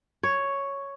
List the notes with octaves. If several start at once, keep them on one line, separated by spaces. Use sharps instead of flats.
C#5